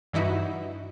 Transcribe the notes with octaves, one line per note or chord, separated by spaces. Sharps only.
G2 E3 D#4 E4 F#4